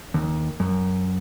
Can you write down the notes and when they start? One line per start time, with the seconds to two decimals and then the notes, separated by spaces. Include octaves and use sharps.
0.14 D#2
0.60 F#2